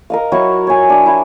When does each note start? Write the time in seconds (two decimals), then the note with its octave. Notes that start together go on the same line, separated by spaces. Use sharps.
0.10 A#4 D#5 F5
0.32 F#3 E4 F#4 C#6
0.67 C#5 G#5
0.90 D4
1.06 E4